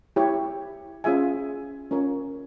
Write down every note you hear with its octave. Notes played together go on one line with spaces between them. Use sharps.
E4 G4 C#5
C#4 F4 G#4 E5 G#5
C#4 F4 A#4 C#5